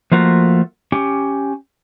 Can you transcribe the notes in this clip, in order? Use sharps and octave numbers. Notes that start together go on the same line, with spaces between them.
F3 A3 A#3 F4 F#4
C#4 G4